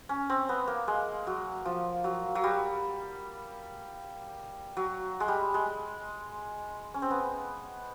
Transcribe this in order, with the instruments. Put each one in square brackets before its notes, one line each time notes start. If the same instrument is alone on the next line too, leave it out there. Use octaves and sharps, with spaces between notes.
[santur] C#4
C4
B3
A#3
G#3
F#3
F3
F#3
F#3
G3
F#3
G#3
G3
G#3
C#4
C4
B3